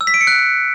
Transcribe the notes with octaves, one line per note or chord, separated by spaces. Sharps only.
E6
B6
D7
C#7
F#6